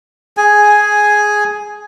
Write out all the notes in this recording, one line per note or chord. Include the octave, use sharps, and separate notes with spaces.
G#4 G#5